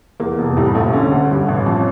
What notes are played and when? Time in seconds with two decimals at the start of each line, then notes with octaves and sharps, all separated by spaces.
0.20 E2 A#3
0.38 F1
0.57 A2 G3
0.75 A#1 A3
0.93 D3 C#4
1.11 D2
1.30 G2
1.48 A1
1.66 F2